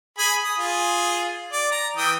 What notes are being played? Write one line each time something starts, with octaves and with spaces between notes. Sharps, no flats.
G#4 G#5 B5
D#6
F4 G#4
D5
A#5
E3 G5 D#6